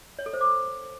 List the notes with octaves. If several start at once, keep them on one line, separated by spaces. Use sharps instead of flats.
C#5
A4
C5
D6